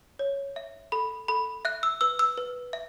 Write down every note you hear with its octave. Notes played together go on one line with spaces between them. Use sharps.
C#5
E5
A4 B5
A4 B5
E5 F#6
E6
B4 E6
E6
B4
E5